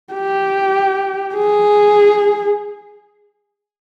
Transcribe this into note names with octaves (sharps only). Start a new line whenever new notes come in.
G4
G#4